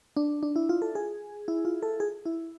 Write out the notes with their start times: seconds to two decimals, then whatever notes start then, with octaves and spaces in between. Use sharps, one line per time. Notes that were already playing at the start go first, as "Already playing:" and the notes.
0.17 D4
0.43 D4
0.56 E4
0.69 F4
0.82 A4
0.95 G#4
1.48 E4
1.65 F4
1.83 A4
2.00 G#4
2.26 E4